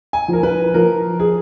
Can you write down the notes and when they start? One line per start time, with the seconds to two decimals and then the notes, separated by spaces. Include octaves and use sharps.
0.13 G#5
0.28 F3 A#4
0.43 B4
0.74 F3 A#4
1.20 G#4